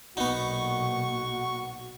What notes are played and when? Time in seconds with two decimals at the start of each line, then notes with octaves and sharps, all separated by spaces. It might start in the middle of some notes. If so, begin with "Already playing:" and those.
0.17 B1 A#2 B3 D#4 F#4 C#6